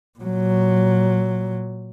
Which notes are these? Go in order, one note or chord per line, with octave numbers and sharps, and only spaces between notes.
A#2 F#3